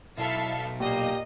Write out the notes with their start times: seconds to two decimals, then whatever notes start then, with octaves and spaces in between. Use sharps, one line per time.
0.18 B1 E4 A4 E5 F5
0.80 A#2 A#3 G4 D#5